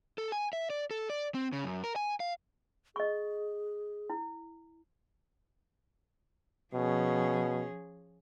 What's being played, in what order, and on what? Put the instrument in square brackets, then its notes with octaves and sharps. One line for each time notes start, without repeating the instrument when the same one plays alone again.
[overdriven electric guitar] A4
G#5
E5
D5
A4
D5
C4
C#3
F#2
A#4
G#5
F5
[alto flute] G#4 [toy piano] D#5 C#6
[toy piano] E4
[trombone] B2 [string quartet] F3 C#4 G#4